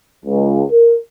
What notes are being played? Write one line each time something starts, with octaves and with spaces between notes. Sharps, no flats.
C#2
A#4